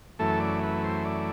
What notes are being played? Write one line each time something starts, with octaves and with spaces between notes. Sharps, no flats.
F#2 E3 A3 A4
D5
B4
C5
D5